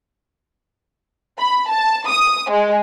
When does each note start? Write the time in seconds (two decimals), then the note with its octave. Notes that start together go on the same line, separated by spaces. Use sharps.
1.39 B5
1.69 A5
2.07 D#6
2.50 G#3